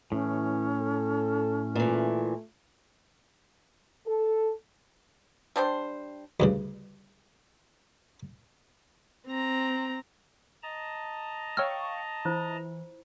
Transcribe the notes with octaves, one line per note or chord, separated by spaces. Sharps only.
A2 E3 C#4
A4
A#2 E3 A3
A4
G3 D4 C5 G5
D2 G2 C#3
C4 A#5
D#5 A5 A#5
C#5 F5 G5 C#6 E6 F6
E3 E4 F4 C5